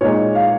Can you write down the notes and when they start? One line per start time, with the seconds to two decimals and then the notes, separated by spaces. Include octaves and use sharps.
0.01 A#2 G#3 D#4 C#5
0.35 F5